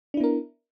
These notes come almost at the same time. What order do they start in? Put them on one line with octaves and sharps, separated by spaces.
D4 E4 B3 A#4